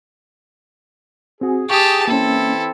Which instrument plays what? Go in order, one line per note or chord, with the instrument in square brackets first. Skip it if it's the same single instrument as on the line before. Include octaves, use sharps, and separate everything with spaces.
[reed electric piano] C4 F#4 [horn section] G#4
[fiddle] G4 A5 [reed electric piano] C#6 D#6
[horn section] E3 C4 E4 [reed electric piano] A#3 C#4 [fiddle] A4